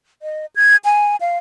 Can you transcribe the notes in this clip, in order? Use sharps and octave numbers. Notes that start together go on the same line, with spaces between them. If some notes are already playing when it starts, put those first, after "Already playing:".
D#5
G#6
G#5
F5